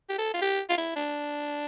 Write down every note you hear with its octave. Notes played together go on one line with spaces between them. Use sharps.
G4
A4
F4
G4
F4
E4
D4